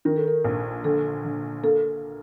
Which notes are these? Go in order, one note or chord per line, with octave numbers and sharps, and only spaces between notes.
D#3 A#4
A4
A#4
A#1
D3 A4
D3
A#3 A4